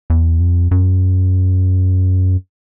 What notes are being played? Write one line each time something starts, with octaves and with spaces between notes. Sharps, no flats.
E2
F2
F#2